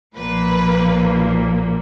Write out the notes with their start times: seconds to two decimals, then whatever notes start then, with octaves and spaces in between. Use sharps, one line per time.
0.15 B1 A#2 F3 A#3 B4